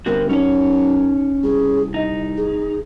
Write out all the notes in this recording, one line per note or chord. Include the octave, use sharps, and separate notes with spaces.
G1 C4 F#4 A#4
F#2 C#4 D#4 C#5
C2 G#4
D#4 D#5
G#4